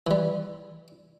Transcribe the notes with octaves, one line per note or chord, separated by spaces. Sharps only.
E3 G3